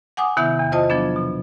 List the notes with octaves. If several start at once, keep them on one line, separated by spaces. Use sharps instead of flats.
F#5 G#5 D6 D#6
C3 D#3 B3 E4 E5 G6
E2
F4 C5 D#5 A5 D#6
F3 F#3 B3 D4
B2